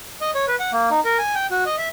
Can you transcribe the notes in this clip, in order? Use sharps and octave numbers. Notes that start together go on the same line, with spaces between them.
D#5
C#5
B4
F#5
A#3
D#4
A#4
G#5
G5
F#4
D#5
E5